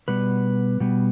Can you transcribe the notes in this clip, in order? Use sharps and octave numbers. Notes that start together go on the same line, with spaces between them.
B2 G3 B3 B4
B2 G3 B3